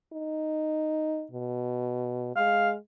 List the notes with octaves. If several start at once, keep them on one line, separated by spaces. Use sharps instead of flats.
D#4
B2
G#3 F5